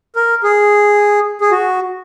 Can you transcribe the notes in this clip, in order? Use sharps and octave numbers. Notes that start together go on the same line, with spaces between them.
A#4
G#4
G#4
F#4